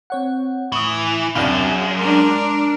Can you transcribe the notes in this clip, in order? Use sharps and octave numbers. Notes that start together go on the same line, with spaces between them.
C4 C#5 F#5
A2 E3 C#6 D#6
E1 C2 F#2 D4 D5 F5
G#4
G#3 D4 A#4 C6